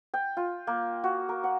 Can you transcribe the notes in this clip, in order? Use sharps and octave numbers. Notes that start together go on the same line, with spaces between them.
G5
F4
A#3
F#4
A#4
F#5